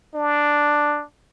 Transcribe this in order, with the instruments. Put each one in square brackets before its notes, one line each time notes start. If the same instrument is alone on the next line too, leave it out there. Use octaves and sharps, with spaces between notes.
[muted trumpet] D4